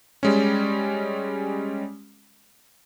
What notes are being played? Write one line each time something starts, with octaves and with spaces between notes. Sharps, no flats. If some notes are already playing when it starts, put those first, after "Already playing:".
G3 G#3 C#4